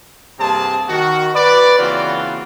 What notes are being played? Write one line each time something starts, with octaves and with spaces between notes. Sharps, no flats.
G2 C3 A#3 C4 G#4 A5
D#3 F#4
B4 D5
C#3 E3 A#3 C4 F4 F#4